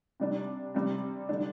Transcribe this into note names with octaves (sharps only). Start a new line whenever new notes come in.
C3 G3 D4
C3 G3 C4
D3 G3 D4